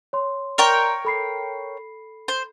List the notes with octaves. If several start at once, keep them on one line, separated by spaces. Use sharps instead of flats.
C#5 C6
A#4 C#5 D5 G5 A#5 C6
A4 B5 C7
C5